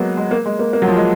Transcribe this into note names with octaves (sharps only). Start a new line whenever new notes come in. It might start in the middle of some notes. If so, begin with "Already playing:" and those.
Already playing: F#3 G#3 A#3 B3
G#3
A#3
G#3
A#3
A#3
F#3
F3
G#3